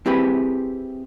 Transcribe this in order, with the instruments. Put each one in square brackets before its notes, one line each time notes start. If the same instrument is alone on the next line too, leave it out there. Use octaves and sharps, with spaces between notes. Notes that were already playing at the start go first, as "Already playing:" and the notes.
[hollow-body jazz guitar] C4 E4 G4 G#4 B4 B5